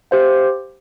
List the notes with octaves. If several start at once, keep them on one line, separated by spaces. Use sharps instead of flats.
G4 C5 F5